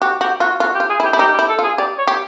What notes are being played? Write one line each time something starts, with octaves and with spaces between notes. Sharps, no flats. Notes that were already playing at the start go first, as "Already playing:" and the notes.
F#4 G4
F#4 G4
F4 F#4
F4 F#4
G4
F4
G#4
E4
G4
E4
D#4 G4
G4
E4
A4
F4
G#4
G4 D5
C#5
G4